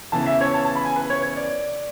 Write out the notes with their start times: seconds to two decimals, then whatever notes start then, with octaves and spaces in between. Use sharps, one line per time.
0.12 C#3 E3 B3 A5
0.26 E5
0.41 C#5
0.54 A5
0.65 A5
0.75 B5
0.85 G#5
0.96 B4
1.10 C#5
1.23 C#5
1.36 D5